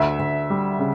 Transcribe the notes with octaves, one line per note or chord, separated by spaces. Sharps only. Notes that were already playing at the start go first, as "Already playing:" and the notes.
Already playing: D2 E5
D2
G3
C#3